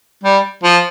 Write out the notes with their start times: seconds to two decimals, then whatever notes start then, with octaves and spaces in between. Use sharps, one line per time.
0.24 G3
0.64 F3